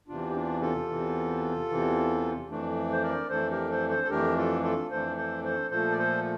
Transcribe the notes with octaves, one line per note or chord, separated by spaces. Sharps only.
E2 C3 E3 D4 F4
G4
D4 F4
F4 A4
E2 C3 E3
E2 C3 E3
F2 E3 A3 D4
C5
A#4 D5
F2 E3 A3 D4 A4 C5
G4 A#4
A4 C5
A4 C5
A4
F2 E3 A3 D4 G4 A#4
F4 A4
F4 A4
F2 E3 A3 D4 A4 C5
A4 C5
A4 C5
A#2 F3 A3 A4 C5
D5
A4 C5